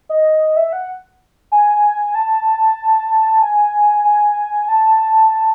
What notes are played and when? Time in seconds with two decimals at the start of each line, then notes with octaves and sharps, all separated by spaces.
0.09 D#5
0.57 E5
0.73 F#5
1.52 G#5
2.15 A5
3.42 G#5
4.05 G#5
4.69 A5
5.31 A5